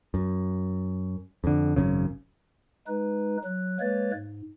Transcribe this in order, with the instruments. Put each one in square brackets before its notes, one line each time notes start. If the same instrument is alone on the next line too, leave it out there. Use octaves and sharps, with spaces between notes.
[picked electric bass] F#2
F2 D3
G#1 F#2 C#3
[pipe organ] G#3 D#4 B4
F#3 F#6
G#3 A#3 B4 C#5 A6
G#2